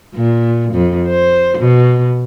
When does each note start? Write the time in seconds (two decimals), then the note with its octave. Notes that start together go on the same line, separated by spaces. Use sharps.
0.15 A#2
0.73 F2
1.08 C5
1.58 B2